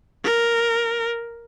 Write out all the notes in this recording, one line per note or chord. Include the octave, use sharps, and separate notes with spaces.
A#4